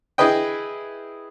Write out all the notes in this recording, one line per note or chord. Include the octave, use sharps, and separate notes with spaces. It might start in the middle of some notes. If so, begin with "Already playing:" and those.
E4 G#4 B4 D#5 G5